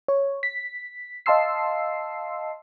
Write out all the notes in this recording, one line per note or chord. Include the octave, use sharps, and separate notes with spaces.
C#5
B6
D#5 F5 A5 C6 E6 C7